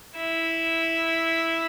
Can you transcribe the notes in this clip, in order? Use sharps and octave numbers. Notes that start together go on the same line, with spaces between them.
E4